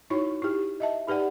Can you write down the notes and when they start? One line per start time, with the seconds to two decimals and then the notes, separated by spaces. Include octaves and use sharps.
0.10 D#4 E4 F#4 C#5 C#6
0.42 E4 G4
0.80 D#5 E5 A5
1.07 D#4 G4 B4 D5 F#5